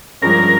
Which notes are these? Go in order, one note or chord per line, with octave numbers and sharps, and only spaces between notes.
G2 F3 G#3 C#4 A#4